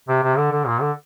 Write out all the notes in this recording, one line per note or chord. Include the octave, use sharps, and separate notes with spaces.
C3
C3
D3
D3
A#2
D3